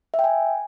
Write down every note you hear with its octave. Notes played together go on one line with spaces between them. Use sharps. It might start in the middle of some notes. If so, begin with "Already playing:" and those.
E5
G5
G#5